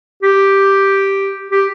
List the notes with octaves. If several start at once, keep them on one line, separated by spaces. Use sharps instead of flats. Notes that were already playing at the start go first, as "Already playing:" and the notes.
G4
G4